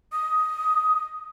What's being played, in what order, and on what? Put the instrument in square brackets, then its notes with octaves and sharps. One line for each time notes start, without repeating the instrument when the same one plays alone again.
[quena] D#6